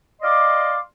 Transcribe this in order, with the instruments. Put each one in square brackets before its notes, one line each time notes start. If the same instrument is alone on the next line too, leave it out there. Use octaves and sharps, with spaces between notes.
[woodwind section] D5 D#5 F5 C6 D6